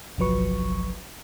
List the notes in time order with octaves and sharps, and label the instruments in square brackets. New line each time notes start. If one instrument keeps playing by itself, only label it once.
[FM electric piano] G1 C2 F3 F#3 B4 C#6